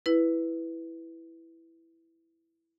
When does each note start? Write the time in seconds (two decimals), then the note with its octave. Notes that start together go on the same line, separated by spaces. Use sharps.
0.06 E4 B4